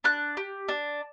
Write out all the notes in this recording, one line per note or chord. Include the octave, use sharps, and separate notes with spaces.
D4 F#6
G4
D4